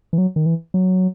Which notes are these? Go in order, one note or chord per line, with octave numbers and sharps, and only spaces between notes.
E3
F#3
D#3
E3
F#3